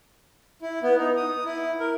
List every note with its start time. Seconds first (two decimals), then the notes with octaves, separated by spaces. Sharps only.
0.62 E4
0.83 B3
0.98 D#4
1.17 D#6
1.45 E4
1.80 A#4